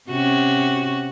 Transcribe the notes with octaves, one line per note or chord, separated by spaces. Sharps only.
C3 C#4 F#4